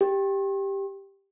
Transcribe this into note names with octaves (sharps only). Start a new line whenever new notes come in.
G4